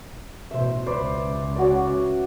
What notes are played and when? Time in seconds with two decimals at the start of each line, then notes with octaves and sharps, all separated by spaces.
0.51 A1 B2 C5 E5
0.86 C#2 B4 C5 D5
1.56 C#4 F#4 D5